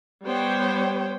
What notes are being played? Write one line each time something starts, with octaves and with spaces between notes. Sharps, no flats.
G3 B3 C5 C#5 G5